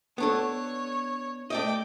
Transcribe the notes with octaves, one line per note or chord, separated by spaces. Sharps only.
B3 D4 A4 C#5
A3 D5 D#5 G5 D6